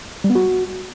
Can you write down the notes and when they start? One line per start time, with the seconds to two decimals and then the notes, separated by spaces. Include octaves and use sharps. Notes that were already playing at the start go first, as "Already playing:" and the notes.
0.24 G3
0.30 B3
0.35 F#4